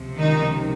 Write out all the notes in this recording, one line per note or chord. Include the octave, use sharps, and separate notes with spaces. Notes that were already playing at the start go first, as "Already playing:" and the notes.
Already playing: C#2 C3 F3
D#3 D#4